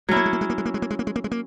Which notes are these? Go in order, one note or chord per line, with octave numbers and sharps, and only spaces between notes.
F#3 G#3 A#3 C#4 E4
G#3
A#3
G#3
A#3
G#3
A#3
G#3
A#3
G#3
A#3
G#3
A#3
G#3
A#3